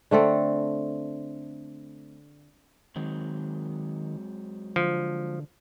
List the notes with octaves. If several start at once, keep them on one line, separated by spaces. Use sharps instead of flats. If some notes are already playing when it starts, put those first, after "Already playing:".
D3 A3 C4 A4
D#3 F#3 G#3 C4
D3 F3